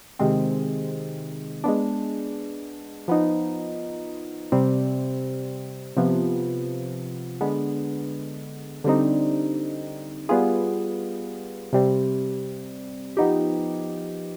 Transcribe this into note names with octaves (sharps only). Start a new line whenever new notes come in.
C3 D#3 G#3 C4
G#3 B3 D4
F3 B3 D#4
C3 G3 C4
C3 F3 B3
D3 G#3 B3
D3 G3 C4 D#4
G3 B3 F4 G#4
C3 G3 C4
F3 B3 D#4 G4